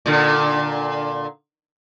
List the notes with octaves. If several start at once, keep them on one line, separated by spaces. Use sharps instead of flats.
A#2 D3